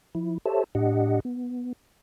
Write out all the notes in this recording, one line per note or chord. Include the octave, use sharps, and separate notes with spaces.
F3 E4
G4 A4 C5 C#5 E5 A5
A2 D4 G4 D#5 F#5
B3